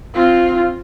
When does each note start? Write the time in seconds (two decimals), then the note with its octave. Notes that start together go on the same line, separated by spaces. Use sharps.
0.14 C4 F4